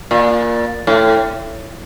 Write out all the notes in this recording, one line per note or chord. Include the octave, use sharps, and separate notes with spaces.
A#2
A2